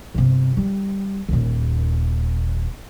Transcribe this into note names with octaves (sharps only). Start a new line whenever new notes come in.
G1 C3
G3
D#1 D#2